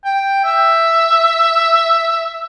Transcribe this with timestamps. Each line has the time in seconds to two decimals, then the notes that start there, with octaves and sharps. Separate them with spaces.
0.05 G5
0.44 E5